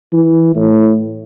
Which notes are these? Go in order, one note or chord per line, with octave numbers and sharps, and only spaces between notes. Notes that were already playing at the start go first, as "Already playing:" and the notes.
E3
A2